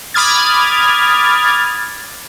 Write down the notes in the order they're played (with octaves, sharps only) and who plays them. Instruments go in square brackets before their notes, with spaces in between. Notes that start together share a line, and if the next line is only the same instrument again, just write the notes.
[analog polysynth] B5 D6 D#6 F6 G#6 A6